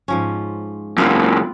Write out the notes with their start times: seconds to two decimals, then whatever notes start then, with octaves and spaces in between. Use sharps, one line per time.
0.08 G#2 F3 C#4
0.98 C#2 F#2 B3 C4 F4